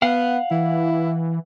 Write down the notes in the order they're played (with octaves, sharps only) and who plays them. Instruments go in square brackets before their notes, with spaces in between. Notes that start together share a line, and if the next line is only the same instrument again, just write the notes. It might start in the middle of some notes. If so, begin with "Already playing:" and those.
[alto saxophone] B3 [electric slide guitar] F5 F#5
[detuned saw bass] E3 [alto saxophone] E4